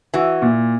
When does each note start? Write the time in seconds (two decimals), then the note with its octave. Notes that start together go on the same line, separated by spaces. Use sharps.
0.14 E3 F#4
0.42 A#2